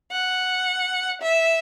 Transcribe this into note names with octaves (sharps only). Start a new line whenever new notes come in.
F#5
E5